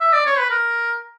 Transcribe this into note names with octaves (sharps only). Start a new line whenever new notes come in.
E5
D5
C#5
B4
A#4